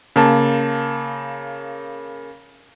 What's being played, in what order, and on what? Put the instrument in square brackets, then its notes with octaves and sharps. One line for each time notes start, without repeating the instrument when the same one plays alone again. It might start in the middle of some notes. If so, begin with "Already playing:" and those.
[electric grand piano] C#3 A#3 A5